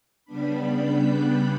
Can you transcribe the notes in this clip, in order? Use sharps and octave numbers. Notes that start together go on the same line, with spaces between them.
C#3 G3 B3 D4 B5
G6
F#6